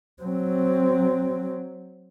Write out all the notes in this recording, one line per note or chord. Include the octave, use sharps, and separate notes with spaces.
F#3 C4